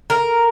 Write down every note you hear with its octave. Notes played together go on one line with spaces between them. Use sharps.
A#4